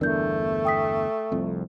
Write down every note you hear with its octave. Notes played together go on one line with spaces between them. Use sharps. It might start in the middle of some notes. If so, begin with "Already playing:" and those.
G1 E2 A3 D4 A#4 G6
G5 D#6 B6
F1 C2 F2